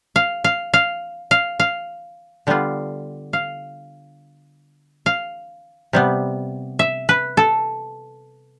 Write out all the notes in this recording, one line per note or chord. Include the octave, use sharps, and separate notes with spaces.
F5
F5
F5
F5
F5
D3 G3 B3 F4
F5
F5
C3 G3 B3
E5
B4
A4